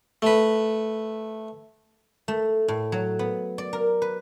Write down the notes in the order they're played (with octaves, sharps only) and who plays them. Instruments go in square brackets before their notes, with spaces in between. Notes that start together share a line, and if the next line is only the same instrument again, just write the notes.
[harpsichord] A3 B4
[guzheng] A3
A2
F#3
B3
D5
A#4
B4